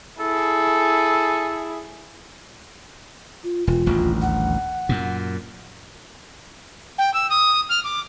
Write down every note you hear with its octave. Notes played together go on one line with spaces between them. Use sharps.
E4 G#4 A4
F4
E1 F4
D#1 A1 D2
F#5
F#2 A#2
G5
E6
D#6
F6
D6